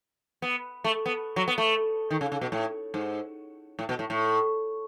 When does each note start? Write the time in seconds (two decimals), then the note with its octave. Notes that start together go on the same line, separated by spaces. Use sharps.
0.42 B3
0.84 A3
1.06 B3
1.36 F#3
1.48 B3
1.58 A3
2.10 D#3
2.21 C#3
2.32 C#3
2.41 B2
2.52 A2
2.94 G#2
3.79 A2
3.89 B2
3.99 A2
4.10 A2